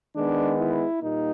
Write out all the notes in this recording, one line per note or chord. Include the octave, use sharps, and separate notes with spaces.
D#3 G#3 B3 D4
E4
A#2 G3 A#3 D#4